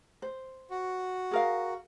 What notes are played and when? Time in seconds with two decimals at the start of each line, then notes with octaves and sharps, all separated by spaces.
0.22 C5
0.71 F#4
1.31 G#4 A#4 F5